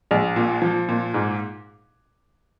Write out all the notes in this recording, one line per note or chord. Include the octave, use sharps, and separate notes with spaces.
A#1
A#2
F3
A#2
G#2